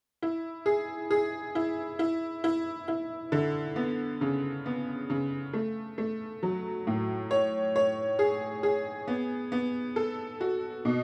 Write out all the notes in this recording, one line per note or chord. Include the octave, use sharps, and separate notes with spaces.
E4
G#4
G#4
E4
E4
E4
E4
D3
B3
C#3
B3
C#3
A3
A3
F#3
A2
C#5
C#5
G#4
G#4
B3
B3
A4
F#4
B2